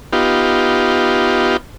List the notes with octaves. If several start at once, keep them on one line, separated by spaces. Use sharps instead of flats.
B3 D#4 F4 G4